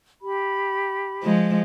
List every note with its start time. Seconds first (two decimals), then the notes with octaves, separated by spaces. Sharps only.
0.21 G4 B5
1.24 F3 G#3